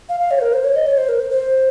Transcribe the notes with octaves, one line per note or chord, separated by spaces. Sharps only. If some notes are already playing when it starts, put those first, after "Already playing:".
F5
F5
C#5
C5
A#4
C5
C#5
D#5
C#5
C5
A#4
C5
C5